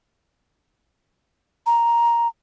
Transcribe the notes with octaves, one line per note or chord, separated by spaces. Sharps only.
A#5